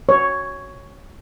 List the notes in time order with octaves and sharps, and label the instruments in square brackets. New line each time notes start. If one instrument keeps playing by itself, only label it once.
[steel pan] C#5